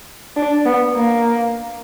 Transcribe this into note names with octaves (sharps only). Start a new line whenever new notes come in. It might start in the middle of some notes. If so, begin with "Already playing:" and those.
D4
B3
A#3